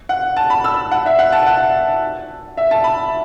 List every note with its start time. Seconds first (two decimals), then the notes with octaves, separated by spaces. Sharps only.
0.09 F#5
0.37 A5
0.50 B5
0.64 E6
0.91 F#5
1.06 E5
1.19 F#5
1.32 A5
1.46 F#5
2.57 E5
2.71 A5
2.84 B5